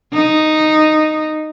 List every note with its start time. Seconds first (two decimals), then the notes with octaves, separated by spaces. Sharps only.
0.13 D#4